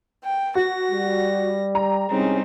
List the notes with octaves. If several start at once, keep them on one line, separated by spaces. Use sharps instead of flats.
G5
F#4 A#6
G3
A#5
C2 G3 G#3 C4 C#4 D#4